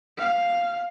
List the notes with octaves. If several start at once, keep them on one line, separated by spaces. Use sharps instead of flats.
F5